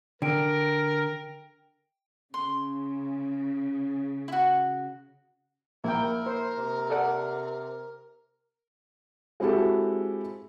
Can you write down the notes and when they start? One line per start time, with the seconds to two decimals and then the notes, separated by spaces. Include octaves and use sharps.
0.22 D3 A#4 G5 D7
2.34 C#3 C6
4.28 E4 F#4
5.84 A#1 A#3 E4 A#4 G5
6.26 C5
6.57 C3
6.90 A4 D5 F#5
9.40 G#3 C4 E4 F#4 G4 A4